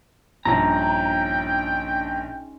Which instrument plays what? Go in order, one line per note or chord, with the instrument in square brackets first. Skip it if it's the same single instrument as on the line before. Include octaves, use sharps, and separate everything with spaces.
[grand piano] A#1 G2 [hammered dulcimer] G#3 C#4 D#4 [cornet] G5 [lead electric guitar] A#5